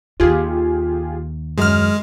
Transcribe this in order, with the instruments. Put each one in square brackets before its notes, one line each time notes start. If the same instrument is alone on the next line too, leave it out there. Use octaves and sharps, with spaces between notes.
[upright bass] D#2 [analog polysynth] F4 G4 G#4
[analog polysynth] F#2 F6 [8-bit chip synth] G#3